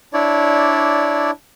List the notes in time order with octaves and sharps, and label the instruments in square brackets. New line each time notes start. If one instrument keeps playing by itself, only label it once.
[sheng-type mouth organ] D4 E4 C#5 D5